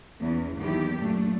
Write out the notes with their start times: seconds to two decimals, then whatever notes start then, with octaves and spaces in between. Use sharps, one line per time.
0.21 E2 C#4
0.57 E2 D#3 F#3 A#3 E4 G4
0.98 F#2 A#2 A3 D4